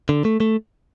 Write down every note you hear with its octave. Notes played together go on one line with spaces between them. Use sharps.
D3
A3
A3